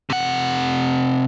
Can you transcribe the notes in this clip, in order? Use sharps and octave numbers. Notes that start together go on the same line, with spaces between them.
C3 F#5